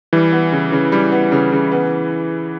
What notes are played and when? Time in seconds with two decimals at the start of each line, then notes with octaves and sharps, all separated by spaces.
0.13 E3 G3
0.32 B3
0.52 C#3
0.72 C#3
0.92 G3
1.12 B3
1.32 C#3
1.52 C#3
1.72 B3